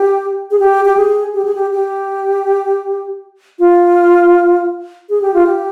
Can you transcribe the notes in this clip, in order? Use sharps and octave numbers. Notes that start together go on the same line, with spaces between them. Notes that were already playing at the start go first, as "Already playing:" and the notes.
Already playing: G4
G#4
G4
G4
G#4
G4
G#4
G4
G4
F4
G#4
G4
F4
G4